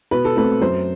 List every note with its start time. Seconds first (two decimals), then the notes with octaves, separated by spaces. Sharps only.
0.11 B2 B4
0.25 A4
0.36 A3 C4 B4
0.62 F#2 C5